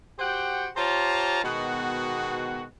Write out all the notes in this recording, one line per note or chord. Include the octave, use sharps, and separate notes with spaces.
F#4 G4 C5 F#5 G5
F4 G4 C5 C#5 A5 A#5
B2 D#3 G#3 B3 F#4